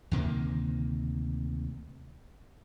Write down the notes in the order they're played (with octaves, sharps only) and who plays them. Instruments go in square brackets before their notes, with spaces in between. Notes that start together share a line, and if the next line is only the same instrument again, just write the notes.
[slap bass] D2 C3 D#3 A#3